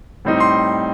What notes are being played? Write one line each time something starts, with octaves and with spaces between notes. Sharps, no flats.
A2 G3 C4 D#4
C6